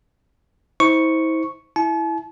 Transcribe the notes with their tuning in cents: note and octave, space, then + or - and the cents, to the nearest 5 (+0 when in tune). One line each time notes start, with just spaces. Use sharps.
E4 -40 C5 +0 C#6 +0
E4 +0 A5 -45